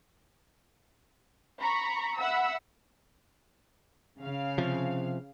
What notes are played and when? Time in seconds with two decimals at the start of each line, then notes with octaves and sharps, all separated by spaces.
1.61 A#5 B5 C#6
2.19 E5 F#5 B5 E6
4.20 C#3 F5
4.58 C3 F3